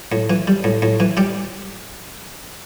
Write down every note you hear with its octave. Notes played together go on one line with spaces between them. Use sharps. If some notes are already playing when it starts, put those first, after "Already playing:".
A2
E3
G3
A2
A2
E3
G3 G4